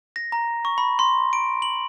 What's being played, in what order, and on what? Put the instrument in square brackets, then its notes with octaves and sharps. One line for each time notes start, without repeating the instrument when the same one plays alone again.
[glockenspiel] A#6
A#5
C#6
B5
C6
D7
F#7